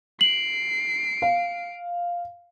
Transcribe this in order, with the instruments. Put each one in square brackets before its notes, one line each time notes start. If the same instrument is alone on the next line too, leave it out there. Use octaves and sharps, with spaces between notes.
[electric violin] C7 D7 [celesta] F#7
[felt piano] F5